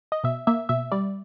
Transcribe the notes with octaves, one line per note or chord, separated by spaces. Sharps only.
D#5
B2 E5
A#3 E5
B2 E5
G3 D5